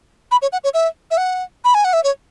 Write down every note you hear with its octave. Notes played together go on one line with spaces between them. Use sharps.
B5
C#5
F#5
C#5
E5
E5
F#5
B5
G#5
F#5
E5
C#5